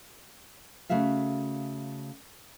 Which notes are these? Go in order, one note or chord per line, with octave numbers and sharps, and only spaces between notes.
C#3 A3 F#4 E5 F5